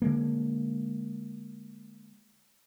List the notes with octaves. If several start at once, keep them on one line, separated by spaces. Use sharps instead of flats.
D3 G#3 A#3